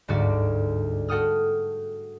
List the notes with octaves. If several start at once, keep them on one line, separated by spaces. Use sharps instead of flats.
G1 D2 G#2 F#4 D5
F#4 A4 F#5 G5 D#6 F6